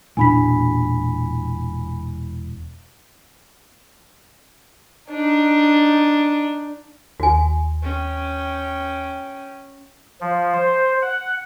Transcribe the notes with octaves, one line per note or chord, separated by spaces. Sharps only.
E1 A#2 D4 G#5 B5 B6
D4 D#4
D#2 F#4 G#5
C#4 G5
F3
C5
F#5